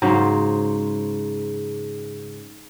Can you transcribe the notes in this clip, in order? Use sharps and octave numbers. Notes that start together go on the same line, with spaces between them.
G#2 C#3 F#3 C5